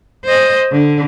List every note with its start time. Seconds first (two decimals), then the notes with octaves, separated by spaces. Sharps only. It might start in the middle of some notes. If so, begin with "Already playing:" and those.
0.25 C5 D#5
0.72 D3